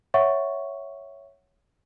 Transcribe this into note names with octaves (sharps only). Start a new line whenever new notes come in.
C#5 E5 F#5 C#6